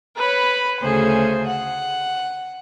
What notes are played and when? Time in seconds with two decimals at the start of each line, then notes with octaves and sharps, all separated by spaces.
0.16 B4 C#5 B5
0.80 D2 C#3 A3 G#4 C5
1.46 F#5